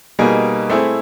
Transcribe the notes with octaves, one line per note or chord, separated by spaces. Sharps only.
B2 G3 A#3 D#4 G#4
A3 C4 E4 G#4